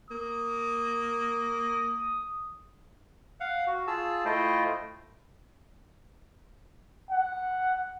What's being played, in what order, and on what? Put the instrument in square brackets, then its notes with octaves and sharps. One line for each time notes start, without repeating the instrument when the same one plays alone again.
[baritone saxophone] A#3 [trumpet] D#6
[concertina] F5 F#5
F#4
F4 G#4 A5 E6
A3 E4 F4 C5 D#5 G5
[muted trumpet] F#5